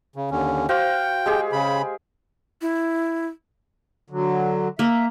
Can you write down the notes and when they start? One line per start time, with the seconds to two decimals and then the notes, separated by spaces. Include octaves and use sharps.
0.16 C#3
0.31 D#2 D3 C#4
0.69 F#4 C5 F5 G5
1.26 G#3 G4 G#4
1.53 C#3 B5
2.62 E4
4.10 D3 F#3
4.79 A#3 E5